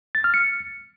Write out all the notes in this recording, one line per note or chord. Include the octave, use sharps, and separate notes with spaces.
A6
F6
C#7